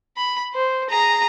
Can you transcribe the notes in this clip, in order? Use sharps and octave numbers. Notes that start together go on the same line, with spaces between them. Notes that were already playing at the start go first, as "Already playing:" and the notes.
B5
C5
G#4 A#5